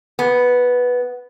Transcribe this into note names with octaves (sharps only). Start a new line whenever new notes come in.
B3